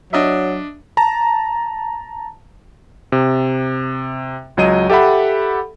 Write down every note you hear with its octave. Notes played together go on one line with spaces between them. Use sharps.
F#3 D4 D#5 E5
A5 A#5
C3
C#2 F#3 D#5 D#7
G4 A4 E5 F#5 B5